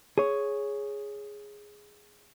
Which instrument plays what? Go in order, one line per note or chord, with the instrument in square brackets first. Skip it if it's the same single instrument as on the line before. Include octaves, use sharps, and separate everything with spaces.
[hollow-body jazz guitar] G#4 C#5